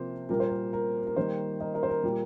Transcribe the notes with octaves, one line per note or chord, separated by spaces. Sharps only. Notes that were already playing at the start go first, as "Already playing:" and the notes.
Already playing: C3 F3 A#3 C5
A#2 G3 A#3 A#4
C5
A#4
A#4
A#4
D#3 G3 A#3 C5
A#4 D#5
A#4 D#5
C5
A#4
A#2 G3 A#3